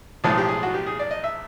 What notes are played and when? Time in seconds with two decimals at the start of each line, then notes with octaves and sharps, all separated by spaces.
0.24 B1 A2 F3 G#3 G#4
0.37 G4
0.48 G#4
0.63 F#4
0.74 G4
0.87 G#4
0.99 D5
1.11 D#5
1.24 E5